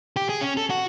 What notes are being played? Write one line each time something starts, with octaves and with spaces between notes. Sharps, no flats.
G4
G#4
C#4
A4
F#4